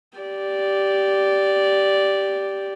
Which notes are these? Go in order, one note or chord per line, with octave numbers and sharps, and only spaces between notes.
G4 D5